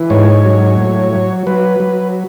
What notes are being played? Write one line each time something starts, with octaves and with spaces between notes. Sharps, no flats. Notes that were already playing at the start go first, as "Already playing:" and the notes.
Already playing: E3
G#2 C#5
F#3
A2
F#3
F#3 B4
F#3